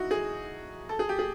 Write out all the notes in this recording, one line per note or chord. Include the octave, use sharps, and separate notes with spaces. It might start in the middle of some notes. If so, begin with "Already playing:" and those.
Already playing: D#4 E4 F#4
G#4
A4
G#4
G4
G#4